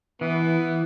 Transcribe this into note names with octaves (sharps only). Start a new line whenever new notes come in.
E3 B3